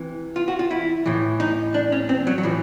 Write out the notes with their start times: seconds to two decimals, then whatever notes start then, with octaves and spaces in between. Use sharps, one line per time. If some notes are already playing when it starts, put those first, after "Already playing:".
Already playing: C3 E3
0.36 F4
0.48 F#4
0.59 F4
0.71 E4
1.06 A2 E3
1.40 D#4
1.74 D4
1.92 C#4
2.09 C4
2.27 F#3
2.38 F#3
2.43 A2 E3 F3